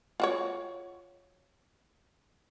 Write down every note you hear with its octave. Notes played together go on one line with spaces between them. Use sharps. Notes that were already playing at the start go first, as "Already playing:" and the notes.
F4 F#4 C#5